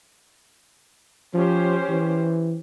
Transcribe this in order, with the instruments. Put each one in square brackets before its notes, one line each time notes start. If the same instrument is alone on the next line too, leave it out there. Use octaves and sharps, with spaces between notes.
[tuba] F3 [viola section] C#4 G4 C5
[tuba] E3